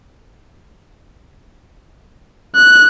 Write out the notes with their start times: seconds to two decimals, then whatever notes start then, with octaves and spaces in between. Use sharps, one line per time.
2.56 F#6